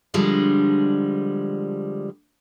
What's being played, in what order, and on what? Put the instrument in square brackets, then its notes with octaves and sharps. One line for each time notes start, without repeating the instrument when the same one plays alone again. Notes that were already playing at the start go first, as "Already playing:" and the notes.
[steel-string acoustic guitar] D3 F3 G3 G#3 D4